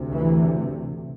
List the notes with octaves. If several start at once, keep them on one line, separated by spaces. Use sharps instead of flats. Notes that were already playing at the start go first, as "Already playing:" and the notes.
Already playing: D2 C3
E3